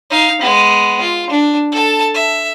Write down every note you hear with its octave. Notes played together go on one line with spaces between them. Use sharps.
D#4 F5
G#3 B3
F4
D4
A4 A5
E5